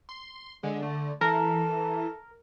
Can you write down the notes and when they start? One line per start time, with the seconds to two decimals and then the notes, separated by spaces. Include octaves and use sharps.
0.09 C6
0.63 D3 G#3
0.82 A3
1.21 E3 A4 A#4